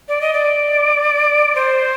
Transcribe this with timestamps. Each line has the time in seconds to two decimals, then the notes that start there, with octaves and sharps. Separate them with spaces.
0.08 D5
0.21 D#5
0.33 D5
1.55 C5